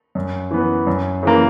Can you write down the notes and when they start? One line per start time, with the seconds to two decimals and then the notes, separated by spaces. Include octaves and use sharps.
0.15 F#2
0.51 E3 B3
0.87 F#2
1.23 C#3 E3 A#3